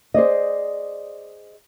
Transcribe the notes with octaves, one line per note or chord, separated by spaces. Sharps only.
G#4 C5 D5 D#5